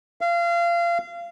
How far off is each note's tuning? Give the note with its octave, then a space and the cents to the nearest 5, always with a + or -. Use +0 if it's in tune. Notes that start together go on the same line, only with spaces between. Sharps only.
F5 -25